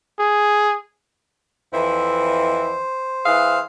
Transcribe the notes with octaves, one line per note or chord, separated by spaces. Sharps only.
G#4
F2 E3 E4 C5
E3 G#4 F5